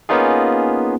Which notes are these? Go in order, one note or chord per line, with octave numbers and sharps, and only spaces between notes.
A#3 B3 C#4 D#4 F4 G#4